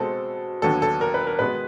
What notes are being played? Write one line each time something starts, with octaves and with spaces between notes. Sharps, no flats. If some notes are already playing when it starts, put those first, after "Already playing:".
Already playing: B2 G#3 C4 A4
D#2 D3 F#3 B3 A4
A4
A#4
B4
A#4
B2 G#3 B3 B4